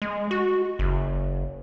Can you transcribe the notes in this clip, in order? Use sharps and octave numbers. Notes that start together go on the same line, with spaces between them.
G#3
F#4
F#1